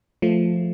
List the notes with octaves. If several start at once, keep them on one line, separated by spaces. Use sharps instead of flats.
F3 A3